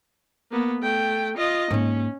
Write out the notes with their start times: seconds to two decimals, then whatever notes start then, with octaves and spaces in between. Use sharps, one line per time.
0.51 A#3 B3
0.82 A3 G5
1.37 F4 D#5
1.71 G#2 A#3 C#4